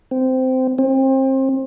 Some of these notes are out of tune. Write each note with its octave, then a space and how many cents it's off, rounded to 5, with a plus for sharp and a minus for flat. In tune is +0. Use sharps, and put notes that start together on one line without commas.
C4 -15
C4 +30